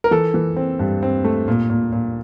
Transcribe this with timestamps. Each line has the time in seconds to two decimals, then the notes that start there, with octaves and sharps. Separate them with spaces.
0.04 A#4
0.11 E3 A4
0.34 E3
0.56 C4
0.79 G2
1.03 C4
1.24 A3
1.48 A#2
1.70 A#2
1.92 A#2